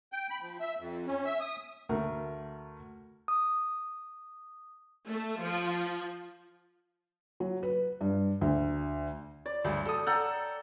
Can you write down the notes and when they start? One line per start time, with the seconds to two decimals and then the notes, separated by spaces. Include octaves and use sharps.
0.12 G5
0.30 B5
0.42 F3
0.60 E5
0.79 F2
1.07 C#4
1.25 E5
1.40 D#6
1.89 D2 A3 A#4
3.28 D#6
5.09 A3
5.40 F3
7.40 F#3
7.63 B4
8.01 G2
8.41 D2
9.46 D5
9.64 D2 G2
9.86 A4 D#6
10.06 A4 F#5 G5 A#5